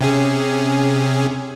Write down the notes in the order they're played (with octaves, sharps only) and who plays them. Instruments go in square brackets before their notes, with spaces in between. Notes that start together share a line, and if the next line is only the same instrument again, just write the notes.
[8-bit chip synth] C3 C#4 G#4